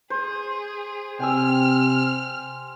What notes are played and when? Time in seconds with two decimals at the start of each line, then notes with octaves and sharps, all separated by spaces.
0.10 G#4 C5
1.20 C3 G5 G#5 E6 F6